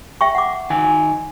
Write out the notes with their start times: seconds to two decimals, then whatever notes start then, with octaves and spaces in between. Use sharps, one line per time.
0.21 E5 G5 C#6
0.35 F#5 D6
0.70 D#3 G#5